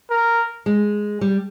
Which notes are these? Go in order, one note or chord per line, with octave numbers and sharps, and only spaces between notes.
A#4
G#3
G3